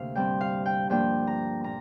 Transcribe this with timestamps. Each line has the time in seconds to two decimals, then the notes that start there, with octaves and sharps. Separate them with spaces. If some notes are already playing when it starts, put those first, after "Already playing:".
Already playing: D2 C3 A#3 F5
0.15 G2 G3 C4 G5
0.41 F5
0.66 G5
0.90 G2 F3 A#3 D4 G5
1.27 A#5
1.64 A#2 A#5